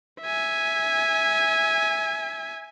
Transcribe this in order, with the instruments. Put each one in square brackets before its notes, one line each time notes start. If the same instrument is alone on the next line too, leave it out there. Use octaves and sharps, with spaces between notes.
[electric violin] E5 G#5